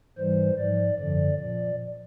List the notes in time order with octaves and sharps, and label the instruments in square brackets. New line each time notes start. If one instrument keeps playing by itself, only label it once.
[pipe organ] G#2 E3 G3 C5
G#2 F3 D5
F#2 D3 F3 D5
A#2 F3 D5